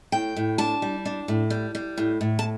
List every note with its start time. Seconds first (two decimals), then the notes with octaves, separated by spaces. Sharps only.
0.12 A2 G5
0.36 A2
0.58 D4 A5
0.82 G3
1.06 D4
1.28 A2
1.50 G3
1.75 G3
1.98 A2
2.21 A2
2.39 A5